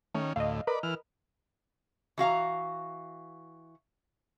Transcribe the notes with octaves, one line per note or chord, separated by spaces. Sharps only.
D#3 A3 C#4
D2 A2 D#5 F5
A#4 B4 D5 D#5 B5
E3 F6
E3 F#4 F5 A#5